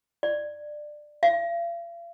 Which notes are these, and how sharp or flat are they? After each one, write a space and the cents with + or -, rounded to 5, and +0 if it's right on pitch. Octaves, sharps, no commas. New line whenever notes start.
D5 +20
F5 -45